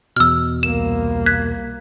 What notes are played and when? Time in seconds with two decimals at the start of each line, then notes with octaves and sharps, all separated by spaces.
0.17 E2 B2 E6 F6
0.63 C2 A#3 E7
1.26 F#6 G#6 B6